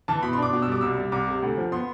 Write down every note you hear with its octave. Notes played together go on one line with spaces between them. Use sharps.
E3 A5
B2 B5
C6
D4 D6
B2
E6
G3 D6
C2 E6
G3
C2 D6
C3
D2
F3
B3 C6